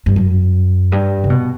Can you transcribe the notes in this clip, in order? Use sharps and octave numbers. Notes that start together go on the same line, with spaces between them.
G2
F#2
G2
C#3
B2